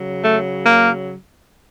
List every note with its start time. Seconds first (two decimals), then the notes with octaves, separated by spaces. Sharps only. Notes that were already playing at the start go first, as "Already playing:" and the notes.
Already playing: C#3 F#3
0.25 A3
0.65 A#3